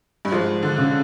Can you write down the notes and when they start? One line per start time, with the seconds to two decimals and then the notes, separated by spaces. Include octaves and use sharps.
0.25 G2
0.32 G#2 F3
0.63 D3
0.78 C#3